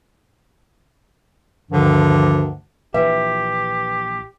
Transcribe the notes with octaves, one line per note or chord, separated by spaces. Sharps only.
D2 G2 D3 D#3 F3
A#1 E3 G4 B4 E5